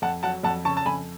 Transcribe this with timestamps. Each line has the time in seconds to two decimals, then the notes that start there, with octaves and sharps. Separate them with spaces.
0.02 F2 F#5 A5
0.23 F#3 F#5 A5
0.43 F2 F#5 A5
0.65 C#3 A5 C#6
0.77 A5
0.86 F2 G#5 B5